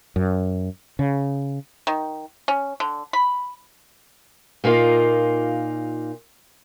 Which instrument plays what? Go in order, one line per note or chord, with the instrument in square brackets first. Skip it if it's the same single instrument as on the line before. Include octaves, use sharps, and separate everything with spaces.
[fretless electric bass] F#2
C#3
[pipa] D#3
C#4
D3
B5
[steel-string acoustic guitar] A#2 A#3 D#4 F4